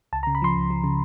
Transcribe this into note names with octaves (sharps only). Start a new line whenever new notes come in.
C#2 A5
A#5
C#3
B5
F3 C6
C#2
F3
C#3